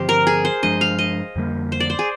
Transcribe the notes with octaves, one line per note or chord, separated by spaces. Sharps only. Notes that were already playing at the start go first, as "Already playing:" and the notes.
Already playing: G2 D3 F3 C4 G4 C5
A#4
G#4
C5
G2 F3 G#3 D4 D#5
F5
D#5
F2 D3 G3 A#3
C5
D5
C5
G#4